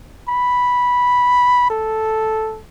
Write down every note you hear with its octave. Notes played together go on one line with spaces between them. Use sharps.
B5
A4